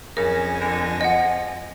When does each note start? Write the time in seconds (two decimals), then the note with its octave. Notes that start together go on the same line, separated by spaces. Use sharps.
0.17 F2 C#3 A#4 G#5 A#6
0.61 D3
1.01 F3 D#5 F#5